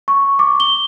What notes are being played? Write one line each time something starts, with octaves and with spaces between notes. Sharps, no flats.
C#6
D6
G7